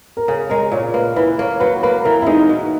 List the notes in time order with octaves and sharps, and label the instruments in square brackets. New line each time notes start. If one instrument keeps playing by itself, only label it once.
[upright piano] A#4
[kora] C#3 [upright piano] G#4
[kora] G#3 [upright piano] A#4
[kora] A#2 [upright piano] C#5
[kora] A#3 [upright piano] B4
[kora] E3 [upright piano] B4
[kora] A#3 [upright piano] C#5
[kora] F#3 [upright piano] B4
[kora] A#3 [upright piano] B4
[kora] E3 [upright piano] A#4
[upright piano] E4
[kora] G#3 [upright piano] D#4
[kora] B2